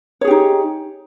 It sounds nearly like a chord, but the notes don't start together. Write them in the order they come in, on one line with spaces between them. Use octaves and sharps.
C#5 G#4 G4 D#4